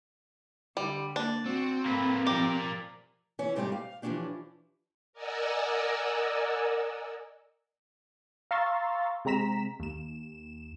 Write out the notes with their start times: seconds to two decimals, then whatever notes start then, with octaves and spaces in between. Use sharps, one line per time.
0.77 D3 G3
1.16 A#3 D4
1.46 C4 F#4
1.86 A2 A#3 A4 B4
2.27 F3 G4 A#4 D5
3.39 E3 C#4
3.56 G#2 G3 A3 C4 E4 G4
3.72 F5
4.02 E3 F3 G#3 C#4 D4 G4
5.13 A#4 D5 D#5 F#5 G#5 E6
8.51 F5 A#5 C6 C#6 E6 A6
9.25 C3 G#3 C4 A#5 B6 E7
9.80 D#2 E7